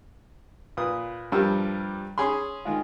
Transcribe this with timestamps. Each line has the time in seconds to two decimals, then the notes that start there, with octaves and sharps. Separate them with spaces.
0.77 A#2 B4 D#6
1.32 G2 F3 G3 G4 A#4 E6
2.18 C#4 G#4 B5 C6
2.65 D#3 G#3 F4